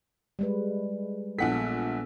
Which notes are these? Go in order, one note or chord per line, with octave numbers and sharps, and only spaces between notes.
G3 G#3 B4
A#1 A#2 B3 A4 F#5 B6